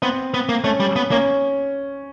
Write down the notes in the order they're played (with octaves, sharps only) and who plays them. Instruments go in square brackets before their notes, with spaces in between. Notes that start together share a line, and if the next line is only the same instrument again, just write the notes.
[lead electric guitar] B3 [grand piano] C4
[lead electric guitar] B3
A#3
[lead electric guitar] A3 [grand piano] C#4
[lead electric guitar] G3
B3
[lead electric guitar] A#3 [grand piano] C#4